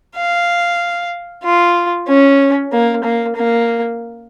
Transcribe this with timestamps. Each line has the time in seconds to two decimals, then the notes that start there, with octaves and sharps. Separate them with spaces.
0.15 F5
1.43 F4
2.07 C#4
2.72 A#3
3.03 A#3
3.36 A#3